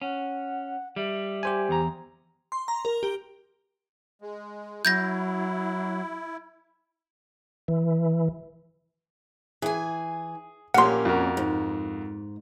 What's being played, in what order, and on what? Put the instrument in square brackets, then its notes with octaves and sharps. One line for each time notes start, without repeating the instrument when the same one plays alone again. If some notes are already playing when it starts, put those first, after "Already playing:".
[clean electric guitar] C#4 [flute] F#5
[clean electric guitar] G3 [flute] E5
[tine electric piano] G4 C5 G#5
[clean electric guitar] E2 A#5
[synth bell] C6
A#5
A#4
G4
[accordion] G#3
[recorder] F#3 [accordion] E4 [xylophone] G6 G#6 A#6
[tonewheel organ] E3
[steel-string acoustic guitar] E3 G#5 [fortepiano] G#4
[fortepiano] A#1 G4 A#4 [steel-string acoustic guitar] A#3 C#4 [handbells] F#5 C6
[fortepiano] F2 F#4 A#4
[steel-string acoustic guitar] G#2